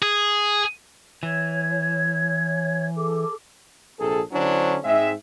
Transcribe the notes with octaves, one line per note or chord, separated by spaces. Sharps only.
G#4
E3 C#5 G#6
G#4 A4 D6
A#1 C3 G#4 A4
D3 F#3 C#4 D4 E4 C5
G#2 G#3 C4 E5